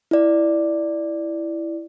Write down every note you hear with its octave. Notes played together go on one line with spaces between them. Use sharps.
E4 D5